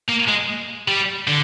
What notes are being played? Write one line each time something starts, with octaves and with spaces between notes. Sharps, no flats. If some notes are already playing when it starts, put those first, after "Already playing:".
A#3
G#3
G3
D3